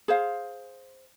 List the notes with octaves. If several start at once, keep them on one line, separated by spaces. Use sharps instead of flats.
G#4 C5 F5